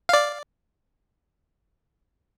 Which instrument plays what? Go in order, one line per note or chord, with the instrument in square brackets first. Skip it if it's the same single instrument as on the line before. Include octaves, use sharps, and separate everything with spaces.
[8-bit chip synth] D5 F5